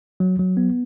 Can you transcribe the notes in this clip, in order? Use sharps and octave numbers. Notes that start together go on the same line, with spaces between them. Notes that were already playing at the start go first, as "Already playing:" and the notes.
F#3
F#3
B3